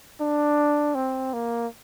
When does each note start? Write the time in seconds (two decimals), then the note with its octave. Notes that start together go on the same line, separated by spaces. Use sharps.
0.20 D4
0.95 C4
1.33 A#3